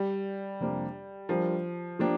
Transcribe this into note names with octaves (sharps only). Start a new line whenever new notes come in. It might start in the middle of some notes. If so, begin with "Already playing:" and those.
Already playing: G3
F2 C3 G3 A#3 D4
F3 G3 D4 F4 A#4
F3 A#3 D4 G4